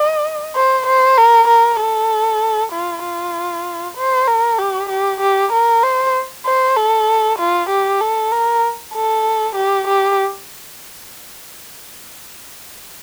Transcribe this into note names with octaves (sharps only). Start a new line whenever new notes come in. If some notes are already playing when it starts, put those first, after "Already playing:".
Already playing: D#5
C5
C5
A#4
A#4
A4
F4
F4
C5
A#4
G4
G4
G4
A#4
C5
C5
A4
F4
G4
A4
A#4
A4
G4
G4